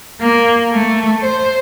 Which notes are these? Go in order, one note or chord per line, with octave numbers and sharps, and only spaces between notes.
A#3
A3
C5